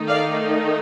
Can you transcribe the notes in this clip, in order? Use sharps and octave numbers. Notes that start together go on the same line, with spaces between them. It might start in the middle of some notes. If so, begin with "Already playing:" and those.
Already playing: D#3 A3 D#4
D5 F5